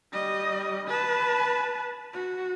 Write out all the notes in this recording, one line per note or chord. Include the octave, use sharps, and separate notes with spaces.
G3 D#5
B4 A5
F#4